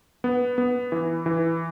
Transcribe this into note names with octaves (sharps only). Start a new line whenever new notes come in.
B3
B3
E3
E3